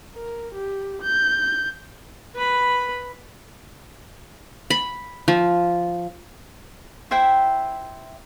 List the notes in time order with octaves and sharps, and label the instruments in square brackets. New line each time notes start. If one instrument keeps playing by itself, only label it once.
[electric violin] A#4
G4
G6
[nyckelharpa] B4 B5
[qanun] B5
F3
[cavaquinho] E4 C5 E5 G5